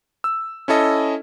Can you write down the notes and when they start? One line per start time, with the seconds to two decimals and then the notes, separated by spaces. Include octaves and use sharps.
0.24 E6
0.68 C#4 E4 A4 D#5